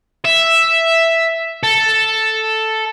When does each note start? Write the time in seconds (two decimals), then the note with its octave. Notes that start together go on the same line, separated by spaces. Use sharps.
0.25 E5
1.63 A4